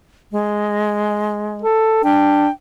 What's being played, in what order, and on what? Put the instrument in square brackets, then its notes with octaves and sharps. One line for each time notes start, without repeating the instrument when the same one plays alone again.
[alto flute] G#3
[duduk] A4
[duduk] D4 [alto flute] G5